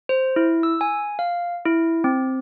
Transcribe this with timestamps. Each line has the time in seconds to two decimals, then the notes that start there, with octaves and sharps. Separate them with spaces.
0.09 C5
0.36 E4
0.63 E6
0.81 G#5
1.19 F5
1.66 E4
2.04 C4